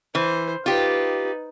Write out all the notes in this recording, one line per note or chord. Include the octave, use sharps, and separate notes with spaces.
E3 C5
D#4 F4 G4 B4